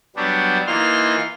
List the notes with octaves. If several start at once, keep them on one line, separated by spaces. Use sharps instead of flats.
F#3 G3 B3 D4 F#4 G4
E3 A#3 D#4 F4 C6 F6